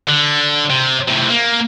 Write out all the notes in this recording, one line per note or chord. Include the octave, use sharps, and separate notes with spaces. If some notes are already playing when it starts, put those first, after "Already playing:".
D3
C3
A2 C3
A#3